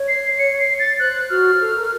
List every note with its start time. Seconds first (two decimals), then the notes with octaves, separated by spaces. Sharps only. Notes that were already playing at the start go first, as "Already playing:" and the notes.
Already playing: C#5
0.08 C7
0.39 C#7
0.59 C7
0.79 A6
0.99 C5 F#6
1.30 F#4 F6
1.60 A4
1.75 A#4